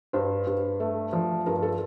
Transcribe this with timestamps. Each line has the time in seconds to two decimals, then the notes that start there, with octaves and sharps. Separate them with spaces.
0.13 G2 C5
0.47 G2
0.80 A3
1.13 F3
1.46 G2 A#4
1.62 A4